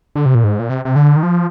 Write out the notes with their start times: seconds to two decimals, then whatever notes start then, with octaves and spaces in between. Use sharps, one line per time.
0.16 D3
0.26 C3
0.35 A#2
0.44 G#2
0.59 A#2
0.70 C3
0.85 C3
0.96 D3
1.16 D#3
1.23 F3